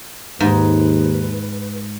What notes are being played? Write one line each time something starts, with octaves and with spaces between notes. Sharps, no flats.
D#2 G#2 B4